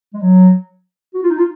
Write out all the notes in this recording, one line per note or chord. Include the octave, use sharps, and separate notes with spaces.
G#3
F#3
F#4
F4
D#4
F4